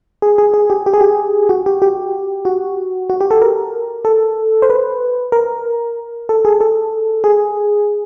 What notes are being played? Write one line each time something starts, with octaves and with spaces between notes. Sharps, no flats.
G#4
G#4
G#4
G4
G4
G#4
G4
F#4
G4
G4
F#4
F#4
G4
A4
A#4
A4
C5
B4
A#4
A4
G#4
A4
G#4